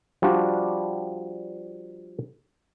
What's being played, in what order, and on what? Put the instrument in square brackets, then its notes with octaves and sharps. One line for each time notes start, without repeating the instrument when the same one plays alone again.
[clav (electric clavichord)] F3 G3 D4 F4 F#4